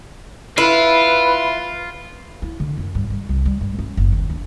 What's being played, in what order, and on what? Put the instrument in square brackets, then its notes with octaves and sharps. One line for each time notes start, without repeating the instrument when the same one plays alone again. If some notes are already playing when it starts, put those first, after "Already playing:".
[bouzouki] E4 [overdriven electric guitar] F4 [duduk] B4
[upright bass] E4
D3
F#2
G2
G3
C2
G3
G2
C#4
F#1
D#2
D4